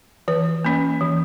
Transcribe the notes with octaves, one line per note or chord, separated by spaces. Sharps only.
E3 B4
A#3 C#4
E3